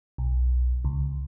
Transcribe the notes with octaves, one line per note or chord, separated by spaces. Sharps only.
B1
C#2